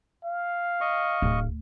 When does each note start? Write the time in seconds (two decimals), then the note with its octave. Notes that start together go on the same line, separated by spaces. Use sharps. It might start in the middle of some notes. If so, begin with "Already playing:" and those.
0.25 F5
0.81 D#5 C#6
1.22 D1